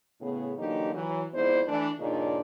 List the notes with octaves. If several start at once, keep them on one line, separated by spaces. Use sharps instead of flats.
A2 C#3 B3
D3 E3 F#3 A#3 D#4 G4
E3 F#3
F2 G#2 B3 E4 C5 D5
E3 A3 D4
G2 A#2 C#3 D4 D#4 D5